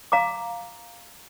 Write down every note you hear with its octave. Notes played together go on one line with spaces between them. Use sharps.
F5 A#5 D6